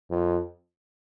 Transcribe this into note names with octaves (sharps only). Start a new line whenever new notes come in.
F2